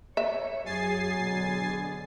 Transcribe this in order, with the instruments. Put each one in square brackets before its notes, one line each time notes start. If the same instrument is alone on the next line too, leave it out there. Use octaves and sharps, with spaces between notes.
[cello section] C#5 [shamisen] E5
[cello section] F#2 G#4 [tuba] F#3 [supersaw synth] G#5 A6 C7
[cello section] B2 D3 G#4